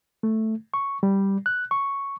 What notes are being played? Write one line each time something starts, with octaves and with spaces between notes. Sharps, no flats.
A3
C#6
G3
F#6
C#6